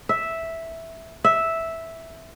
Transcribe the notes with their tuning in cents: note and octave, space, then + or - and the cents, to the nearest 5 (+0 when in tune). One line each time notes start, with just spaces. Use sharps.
E5 -5
E5 -5